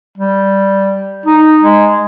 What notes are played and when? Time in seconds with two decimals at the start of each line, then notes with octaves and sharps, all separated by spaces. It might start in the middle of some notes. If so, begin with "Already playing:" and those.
0.18 G3
1.26 D#4
1.63 G#3